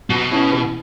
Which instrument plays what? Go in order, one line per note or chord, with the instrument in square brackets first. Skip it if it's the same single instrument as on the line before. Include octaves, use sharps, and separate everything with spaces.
[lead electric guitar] B2 [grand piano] F#3
[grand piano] C#4 E4
E3